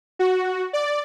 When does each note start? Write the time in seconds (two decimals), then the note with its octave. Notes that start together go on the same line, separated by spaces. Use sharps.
0.19 F#4
0.73 D5